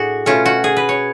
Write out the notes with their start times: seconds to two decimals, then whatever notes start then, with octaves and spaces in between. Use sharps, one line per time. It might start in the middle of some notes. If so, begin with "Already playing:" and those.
Already playing: A2 D4 F#4 G#4
0.26 B2 A3 C#4 F4
0.46 F#4
0.64 G#4
0.77 B4
0.89 C#5